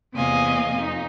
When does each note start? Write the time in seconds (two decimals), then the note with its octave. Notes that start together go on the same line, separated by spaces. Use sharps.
0.14 E2 C3 A#3 D#5 F5 G#5
0.76 F2 D#4